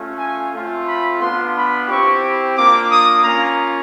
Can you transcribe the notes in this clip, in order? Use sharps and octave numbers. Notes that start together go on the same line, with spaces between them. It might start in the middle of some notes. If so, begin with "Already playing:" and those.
Already playing: A3 C#4 F4
G#5
A3 C4 F4
B5
B3 D4 F4 C6
B5
C4 E4 G4 C#6
A#3 D4 F4 D6
D#6
A#3 C#4 F4 A#5